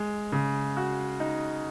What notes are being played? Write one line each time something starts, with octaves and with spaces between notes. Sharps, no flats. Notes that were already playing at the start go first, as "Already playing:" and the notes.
Already playing: G#3
C#3
F#4
D#4